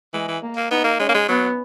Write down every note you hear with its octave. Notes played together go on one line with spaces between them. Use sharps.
E3 G#3
E3
A#3
A#3
B3 D#4
A#3
G#3 C#4
A#3
G#3
F#3 B3